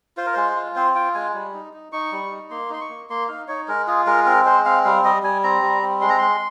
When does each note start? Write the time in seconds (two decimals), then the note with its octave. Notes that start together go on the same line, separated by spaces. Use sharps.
0.17 F4 C5
0.26 A#4
0.34 G#3 C5
0.56 F4
0.76 C4 C5
0.95 F4 G5
1.15 G#3 G#5
1.34 G3
1.54 D#4
1.73 D#4
1.92 D#4 C#6
2.13 G3
2.31 D#4
2.50 A#3 C6
2.70 D#4 C6
2.81 C#6
2.89 A#3
3.10 A#3 C6
3.28 D#4 F5
3.48 D#4 C#5
3.68 G#3 A#4
3.87 F4 G#4
4.07 G#3 A#4
4.26 C4 A#4
4.45 G#3 C5
4.65 C4 F5
4.85 G3 F5
5.04 G3 D#5
5.23 G3 G#5
5.44 C4 A#5
5.62 G3
5.82 C4
6.01 G#3 C6
6.10 A#5
6.18 G#3 C6